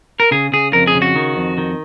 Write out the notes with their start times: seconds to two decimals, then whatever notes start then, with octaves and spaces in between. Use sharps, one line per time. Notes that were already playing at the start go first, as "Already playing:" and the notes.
0.20 A#4
0.31 C#3 G#4
0.52 C#3 G#4
0.73 F2 A#4
0.87 G#4
0.95 C#3
1.02 F#4
1.16 D#3
1.37 F2
1.58 D#3